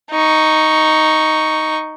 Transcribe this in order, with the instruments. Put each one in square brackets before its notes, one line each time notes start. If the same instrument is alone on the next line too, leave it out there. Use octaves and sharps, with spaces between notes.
[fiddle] D#4 C#6